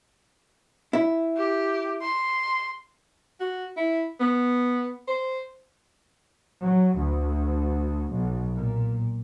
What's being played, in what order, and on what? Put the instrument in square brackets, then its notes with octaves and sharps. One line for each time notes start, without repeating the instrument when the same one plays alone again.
[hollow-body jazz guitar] E4
[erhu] G4
C6
[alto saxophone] F#4
E4
B3
C5
[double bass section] F#3
D2
B1
A#2